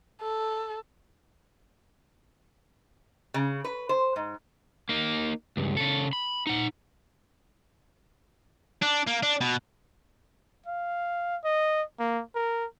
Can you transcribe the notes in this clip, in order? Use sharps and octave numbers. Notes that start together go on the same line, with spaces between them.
A4
C#3
B4
C5
G#2
A#3 D#4
C#2 G2
C#3 A4
B5
D#4 F#5
D4
A#3
D4
B2
F5
D#5
A#3
A#4